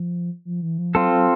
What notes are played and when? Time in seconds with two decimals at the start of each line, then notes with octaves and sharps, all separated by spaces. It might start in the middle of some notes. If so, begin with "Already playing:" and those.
Already playing: F3
0.45 F3
0.62 E3
0.78 F3
0.95 F#3 C4 F4 A4
1.12 F#3